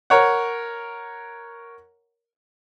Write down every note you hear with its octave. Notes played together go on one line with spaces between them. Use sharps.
A#4 C#5 F#5